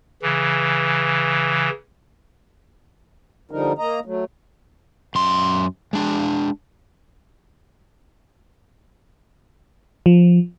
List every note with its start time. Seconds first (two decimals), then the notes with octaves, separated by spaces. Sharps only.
0.22 C#3 E3
3.51 D3 F3 G3 D#4 A#4
3.78 A#3 D#5 A#5
4.05 F#3 A3
5.15 F#2 C6
5.93 G#3 D4
10.06 F3